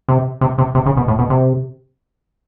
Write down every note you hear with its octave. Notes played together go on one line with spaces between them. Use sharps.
C3
C3
C3
C3
C#3
B2
A2
B2
C3